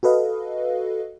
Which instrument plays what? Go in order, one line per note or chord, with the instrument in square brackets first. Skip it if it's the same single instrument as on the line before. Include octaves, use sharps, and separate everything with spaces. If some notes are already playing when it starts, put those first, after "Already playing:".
[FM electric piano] F#4 A4 B4 D#5 F5